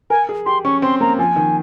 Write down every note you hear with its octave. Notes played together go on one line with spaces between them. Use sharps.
A#4 G#5
G#4
G4 C6
C#4 C#6
C4 C6
A#3 A#5
F3 G#5
D#3